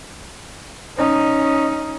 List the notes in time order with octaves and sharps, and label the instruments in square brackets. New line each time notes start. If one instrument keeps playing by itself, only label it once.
[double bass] C#4 D#4